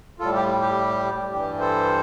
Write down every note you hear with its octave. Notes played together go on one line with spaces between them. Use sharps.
A2 G3 F4 A4
G4
G4
G2 E3 G3 G4
A4 C5